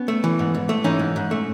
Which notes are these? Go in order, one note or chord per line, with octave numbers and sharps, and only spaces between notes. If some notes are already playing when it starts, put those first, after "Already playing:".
Already playing: B3 C#4
A3
E3
G#2
G#2
A3
E3 C#4 D#4
G#2
G#2
A3